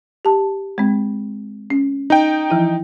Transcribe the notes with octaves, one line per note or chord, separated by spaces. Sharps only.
G4 A5
G#3 C4
C#4
D#4 G5
E3 F3 E4